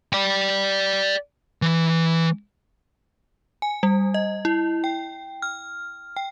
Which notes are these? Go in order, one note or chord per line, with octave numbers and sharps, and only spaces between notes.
D5 G5
E3
G#5
G3
D#5
E4
G5
F6
G5